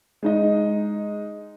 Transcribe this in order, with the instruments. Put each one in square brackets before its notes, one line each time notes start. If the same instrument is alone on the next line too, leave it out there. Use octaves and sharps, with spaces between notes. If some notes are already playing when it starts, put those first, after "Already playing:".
[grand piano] G#3 D#4 D#5